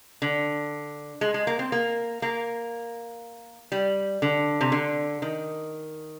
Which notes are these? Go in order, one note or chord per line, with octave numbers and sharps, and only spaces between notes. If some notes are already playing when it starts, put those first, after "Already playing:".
D3
G#3
G#3
A#3
C4
A#3
A#3
G3
D3
C3
D3
D#3